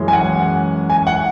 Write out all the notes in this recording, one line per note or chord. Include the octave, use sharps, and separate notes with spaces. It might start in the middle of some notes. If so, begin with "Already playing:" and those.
Already playing: F#2 E3 G#3 C#4
G#5
F#5
G#5
F#5